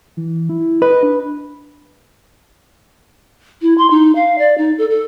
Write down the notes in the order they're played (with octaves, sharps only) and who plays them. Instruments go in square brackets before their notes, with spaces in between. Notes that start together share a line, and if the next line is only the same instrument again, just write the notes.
[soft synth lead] E3
E4
[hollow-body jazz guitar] B4 [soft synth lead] D#5
[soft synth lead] D4
[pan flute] E4
C6
D#4
F5
D5
D#4
A4
A4